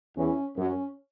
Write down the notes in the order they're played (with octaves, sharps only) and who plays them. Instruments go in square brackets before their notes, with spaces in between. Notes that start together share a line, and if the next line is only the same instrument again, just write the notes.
[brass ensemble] E2 E3 [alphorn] C#4
[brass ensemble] F#2 F#3 [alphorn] C#4